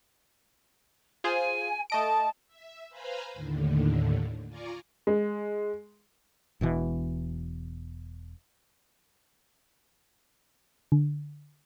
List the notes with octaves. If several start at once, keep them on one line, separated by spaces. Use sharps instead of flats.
F4 G#4 C5 G#5
A3 D#5 A5 D7
E5
B4 C5 F5 G#5 A#5 B5
D#2 A2 D3
F4 D5 G#5 A#5 C#6 D6
G#3
E1 B2 E3
D3